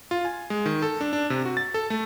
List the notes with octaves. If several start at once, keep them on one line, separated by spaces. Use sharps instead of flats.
F4
G#5
G#3
D#3
A4
D4
D4
C3
F#4
A6
A4
A3